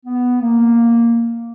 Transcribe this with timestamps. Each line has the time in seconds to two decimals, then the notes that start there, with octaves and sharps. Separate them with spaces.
0.06 B3
0.41 A#3